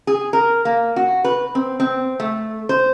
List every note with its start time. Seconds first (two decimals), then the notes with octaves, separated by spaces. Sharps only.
0.07 G#4
0.33 A#4
0.65 A#3
0.96 F#4
1.24 B4
1.55 C4
1.80 C4
2.20 A3
2.69 C5